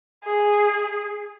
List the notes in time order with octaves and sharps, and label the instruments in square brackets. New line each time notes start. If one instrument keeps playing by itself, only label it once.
[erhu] G#4